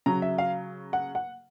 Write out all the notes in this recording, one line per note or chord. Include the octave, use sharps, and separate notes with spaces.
C#3 F#3 A#5
E5
F5
F#5
F#5